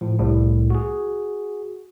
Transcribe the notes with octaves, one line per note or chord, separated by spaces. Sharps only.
A2 F3
C2 A2
F#4 G#4